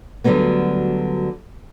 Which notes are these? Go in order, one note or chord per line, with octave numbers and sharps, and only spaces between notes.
D2 D3 F#3 G3 A#3 B3